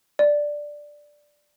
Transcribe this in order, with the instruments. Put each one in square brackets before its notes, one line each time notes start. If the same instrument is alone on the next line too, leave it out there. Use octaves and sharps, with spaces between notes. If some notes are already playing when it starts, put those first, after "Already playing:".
[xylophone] D5